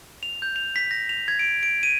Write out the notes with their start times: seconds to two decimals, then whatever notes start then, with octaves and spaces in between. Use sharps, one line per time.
0.23 F7
0.42 G6
0.56 F7
0.76 B6
0.91 A#6
1.09 F7
1.28 G#6
1.39 D7
1.63 D7
1.83 D#7